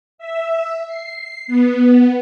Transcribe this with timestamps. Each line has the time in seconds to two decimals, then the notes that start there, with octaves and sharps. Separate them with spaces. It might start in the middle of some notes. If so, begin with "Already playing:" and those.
0.18 E5
0.87 C7
1.47 B3